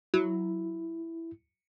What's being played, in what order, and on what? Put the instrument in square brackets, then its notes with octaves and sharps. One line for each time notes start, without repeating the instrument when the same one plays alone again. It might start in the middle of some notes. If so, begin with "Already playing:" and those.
[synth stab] F#3 [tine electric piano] E4